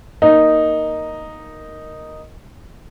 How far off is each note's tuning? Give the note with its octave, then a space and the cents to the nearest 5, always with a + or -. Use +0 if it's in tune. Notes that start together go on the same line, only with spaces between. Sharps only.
A#3 +0 D#4 +0 A#4 +0